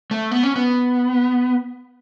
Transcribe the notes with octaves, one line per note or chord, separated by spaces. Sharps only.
A3
B3
C#4
B3